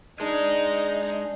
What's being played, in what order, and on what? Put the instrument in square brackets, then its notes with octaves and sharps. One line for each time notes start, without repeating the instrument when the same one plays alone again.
[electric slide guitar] G#3 G#4 [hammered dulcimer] D4 D5 [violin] D#4